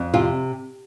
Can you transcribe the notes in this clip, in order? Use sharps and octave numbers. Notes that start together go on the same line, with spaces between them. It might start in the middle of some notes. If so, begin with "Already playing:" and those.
Already playing: F2
C3 F4